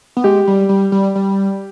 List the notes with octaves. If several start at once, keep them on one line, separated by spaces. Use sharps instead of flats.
B3
G#3 G4
G3
G3
G3
G3